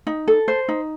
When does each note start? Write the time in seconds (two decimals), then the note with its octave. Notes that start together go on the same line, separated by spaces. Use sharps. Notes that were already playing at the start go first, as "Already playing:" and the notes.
0.07 D#4
0.28 A4
0.48 C5
0.68 D#4